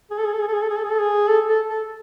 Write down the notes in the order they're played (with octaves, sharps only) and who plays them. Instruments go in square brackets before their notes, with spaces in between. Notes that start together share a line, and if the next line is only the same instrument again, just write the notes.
[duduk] G#4
A4
G#4
A4
G#4
A4
G#4
A4
G#4
A4
G#4
A4
G#4
A4
A4
A4